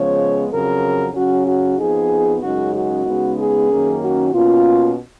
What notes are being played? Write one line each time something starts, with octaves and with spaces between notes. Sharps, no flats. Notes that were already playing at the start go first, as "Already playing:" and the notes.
Already playing: C#3 F3 G#3 B3 C#5
F2 C#3 F#3 A#4
C#3 F#3 C#4 F#4
F#4
F2 F3 B3 D#4 G#4
F#2 C#3 G#3 D#4 F#4
F#4
C#3 G#3 B3 D#4
G#4
F#2 D#3 A#3 C#4
F#4
B2 A#3 C#4 F4